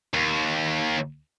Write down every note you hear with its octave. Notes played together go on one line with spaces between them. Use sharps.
D#2